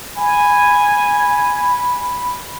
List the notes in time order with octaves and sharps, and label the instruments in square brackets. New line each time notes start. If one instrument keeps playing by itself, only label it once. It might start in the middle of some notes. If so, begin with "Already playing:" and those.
[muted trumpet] G#5 [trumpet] B5